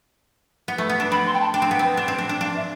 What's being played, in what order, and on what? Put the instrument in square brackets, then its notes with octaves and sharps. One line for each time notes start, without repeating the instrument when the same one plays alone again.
[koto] B3
A3
B3
D4
[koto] C4 [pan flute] B5
[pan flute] C6
G5
A5
[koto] D4 [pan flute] G5
[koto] C4
B3
C4
D4
C4
D4
D4
[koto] D4 [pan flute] F5
[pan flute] E5